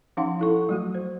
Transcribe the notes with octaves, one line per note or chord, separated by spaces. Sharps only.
F3 C#4 D#4 F5 F#5 C6
E4 A4 C#6
F#3 A3 F#4
C5